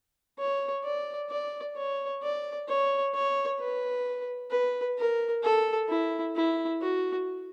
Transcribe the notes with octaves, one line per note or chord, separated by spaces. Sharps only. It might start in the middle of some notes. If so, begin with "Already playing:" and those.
C#5
D5
D5
C#5
D5
C#5
C#5
B4
B4
A#4
A4
E4
E4
F#4